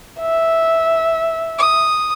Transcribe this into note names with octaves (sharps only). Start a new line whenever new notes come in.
E5
D#6